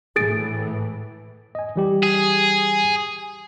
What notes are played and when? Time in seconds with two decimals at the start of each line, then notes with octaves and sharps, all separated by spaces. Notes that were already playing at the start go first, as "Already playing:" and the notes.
0.16 A2 E3 G#4 A6 D7
1.55 D#5 G#5
1.76 E3 G3 G4
2.03 G#4